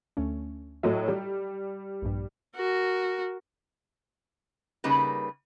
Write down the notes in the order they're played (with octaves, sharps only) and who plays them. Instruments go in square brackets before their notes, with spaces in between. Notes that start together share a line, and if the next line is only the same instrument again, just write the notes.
[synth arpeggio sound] D2 A3 C#4
[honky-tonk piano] A2 F#3 [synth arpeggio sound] E4 A4 D#5
[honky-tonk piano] G3 [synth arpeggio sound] G4
[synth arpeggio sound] A#1 G2
[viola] F#4 A#4
[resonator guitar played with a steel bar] C#3 G3 A#3 D#4 B4